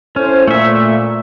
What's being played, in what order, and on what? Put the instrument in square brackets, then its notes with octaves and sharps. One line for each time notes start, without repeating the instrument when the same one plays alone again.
[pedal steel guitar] C#4 [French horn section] E4 A4 C5
[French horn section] A#2 [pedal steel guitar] A3 E5